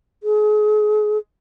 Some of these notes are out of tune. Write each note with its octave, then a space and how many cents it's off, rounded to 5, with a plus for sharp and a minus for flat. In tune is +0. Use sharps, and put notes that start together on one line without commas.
G#4 +35